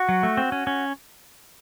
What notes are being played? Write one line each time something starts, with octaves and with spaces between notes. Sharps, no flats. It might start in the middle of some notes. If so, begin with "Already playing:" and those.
Already playing: F#4
F#3
A3
C4
C#4
C#4